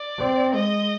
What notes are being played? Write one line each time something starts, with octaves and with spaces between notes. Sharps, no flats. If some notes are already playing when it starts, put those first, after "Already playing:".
Already playing: D5
C4
G#3 D#5